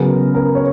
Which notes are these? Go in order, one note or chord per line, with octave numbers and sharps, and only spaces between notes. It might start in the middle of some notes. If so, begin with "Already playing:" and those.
Already playing: C#3 F#3 B3 A#4
A#4
C#5